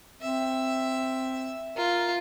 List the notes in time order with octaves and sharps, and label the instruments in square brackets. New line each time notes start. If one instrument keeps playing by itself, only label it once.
[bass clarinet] C4 [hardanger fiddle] E5
[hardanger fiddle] F4 [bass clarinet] A#4